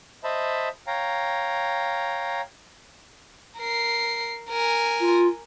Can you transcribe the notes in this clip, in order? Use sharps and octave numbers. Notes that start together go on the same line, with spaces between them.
C5 D#5 E5 A5 B5
C#5 F5 G5 A#5
A#4 C7
A#4 G#5
F4